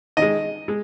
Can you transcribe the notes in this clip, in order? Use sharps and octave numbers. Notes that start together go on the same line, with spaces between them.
D#3 G#3 D#5
G#3